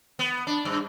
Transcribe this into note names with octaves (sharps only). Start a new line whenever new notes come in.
B3
D4
G2